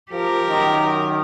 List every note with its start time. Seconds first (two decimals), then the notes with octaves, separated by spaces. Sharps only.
0.11 F3 G4 A#4
0.49 F#2 D#3